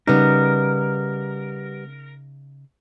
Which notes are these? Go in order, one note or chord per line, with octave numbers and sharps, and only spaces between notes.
C#3 G3 B3 D#4 A#4